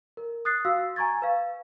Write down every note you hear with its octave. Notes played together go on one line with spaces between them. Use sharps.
A#4
D#6 F#6 A6 C7
F#4 F5 E6
G#5 A#5 C#6 G#6 A6
B4 F5